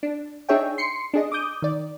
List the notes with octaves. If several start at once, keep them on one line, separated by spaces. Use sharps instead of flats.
D4
D4 D#4 G#4 C#5 E5 G5
C6 C7 C#7
D4 G#4 D#5
D6 D#6 G6
D#3 D5